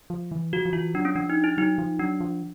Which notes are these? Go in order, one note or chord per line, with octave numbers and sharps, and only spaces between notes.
F3
E3
F3 F#4
F3
E3 F4
F#3 D4
C#4
F3 D4
D#4
E4
F#3 D#4
F3
F#3 D4
F3